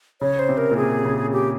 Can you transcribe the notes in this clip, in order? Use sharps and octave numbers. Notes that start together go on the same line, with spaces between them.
C#3 C#5
C5
C3
A#4
A#2
C3 G#4
C#3
G4